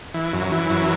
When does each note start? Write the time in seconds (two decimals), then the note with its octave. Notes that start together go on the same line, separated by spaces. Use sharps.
0.14 E3
0.33 F#2
0.52 E3
0.70 F#2